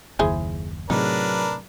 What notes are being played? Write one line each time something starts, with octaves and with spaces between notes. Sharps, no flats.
F#1 D#2 E4 G#4 C5
A2 C3 F#3 D4 D#4 G#4 A#4 B4